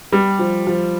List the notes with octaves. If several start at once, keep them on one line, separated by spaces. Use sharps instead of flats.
G3 G4
F3
F3